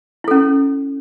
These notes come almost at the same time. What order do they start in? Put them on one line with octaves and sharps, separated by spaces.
E4 A4 C#4